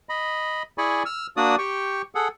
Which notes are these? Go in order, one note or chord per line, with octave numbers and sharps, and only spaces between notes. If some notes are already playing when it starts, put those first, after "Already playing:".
D#5 B5
E4 G#4 D5 G#5 B5 C#6
E6 F6
A#3 D4 F#4 D5 D#6
G4 G5 C#6
G#4 A4 F#5